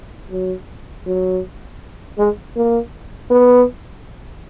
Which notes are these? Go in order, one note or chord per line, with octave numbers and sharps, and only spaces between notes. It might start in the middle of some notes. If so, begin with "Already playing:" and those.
F#3
F#3
G#3
A#3
B3